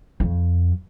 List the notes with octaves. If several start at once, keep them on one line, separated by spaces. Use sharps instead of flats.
F2